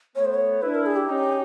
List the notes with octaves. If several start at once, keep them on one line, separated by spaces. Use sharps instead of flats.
A3 B3 C#5
C5
C#5
D4 E4 B4
A#4
G#4
G4
C#4 D#4